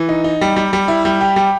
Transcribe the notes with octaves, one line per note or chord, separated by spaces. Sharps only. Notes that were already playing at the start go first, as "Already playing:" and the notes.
Already playing: E3
D#4
D#4
G3
G3
G3
E4
G3
G4
G3